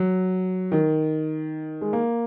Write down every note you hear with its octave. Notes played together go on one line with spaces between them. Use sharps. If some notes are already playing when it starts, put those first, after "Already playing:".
Already playing: F#3
D#3
G#3
A#3